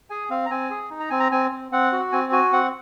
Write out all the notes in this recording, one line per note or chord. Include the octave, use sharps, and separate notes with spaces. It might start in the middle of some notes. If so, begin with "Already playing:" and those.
G#4 G#5
C4 F5
A#5
C4 G#5
G#4
D#4
A#5
C4 G#5
A#5
C4 G#5
C4
C4 F#5
F#4
C4 G#5
F#4 G#5
C4 F#5